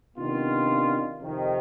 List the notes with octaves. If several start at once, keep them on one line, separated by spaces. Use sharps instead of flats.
C3 D#3 B3 D4 F4
F2 C3 D#3